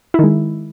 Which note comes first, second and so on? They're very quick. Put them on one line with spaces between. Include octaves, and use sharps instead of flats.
E4 D#3 G#3